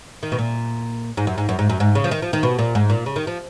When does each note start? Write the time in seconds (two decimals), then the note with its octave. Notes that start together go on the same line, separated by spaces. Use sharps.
0.23 D#3
0.32 B2
0.38 A#2
1.17 G#2
1.27 F#2
1.38 G#2
1.49 F#2
1.59 G#2
1.70 F#2
1.80 G#2
1.95 C#3
2.04 F3
2.11 D#3
2.22 F3
2.33 D#3
2.43 B2
2.59 A#2
2.75 G#2
2.90 A#2
3.06 C#3
3.16 D#3
3.27 F3